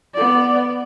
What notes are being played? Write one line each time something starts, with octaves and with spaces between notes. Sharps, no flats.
B3 D5